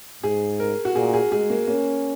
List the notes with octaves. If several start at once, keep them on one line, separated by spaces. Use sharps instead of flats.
G#2 G#4
A#4
F#4
A#2 G#4
G#4
G#3 G#4
A#3
A#3 C#4